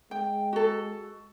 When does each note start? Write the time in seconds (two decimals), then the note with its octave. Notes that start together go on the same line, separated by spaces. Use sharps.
0.11 G#3 G5
0.53 F#4 A4